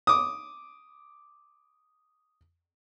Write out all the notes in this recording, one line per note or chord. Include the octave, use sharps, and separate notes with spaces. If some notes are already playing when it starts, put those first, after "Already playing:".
D6 D#6